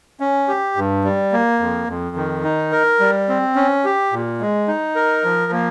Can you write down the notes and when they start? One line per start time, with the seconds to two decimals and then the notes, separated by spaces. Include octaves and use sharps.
0.20 C#4
0.48 G4
0.76 G2
1.04 G3
1.32 A#3
1.60 F2
1.88 F2
2.16 D#3
2.44 D#4
2.72 A#4
3.00 G3
3.29 C4
3.56 C#4
3.85 G4
4.13 A#2
4.41 G#3
4.68 D#4
4.95 A#4
5.24 F3
5.52 A#3